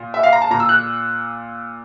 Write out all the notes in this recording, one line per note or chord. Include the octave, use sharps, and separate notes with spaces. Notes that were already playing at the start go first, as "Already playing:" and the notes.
Already playing: A#2
E5
F5
A#5
A5
A#2 A#5
E6
F#6